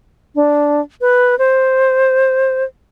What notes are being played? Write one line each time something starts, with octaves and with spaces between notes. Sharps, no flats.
D4
B4
C5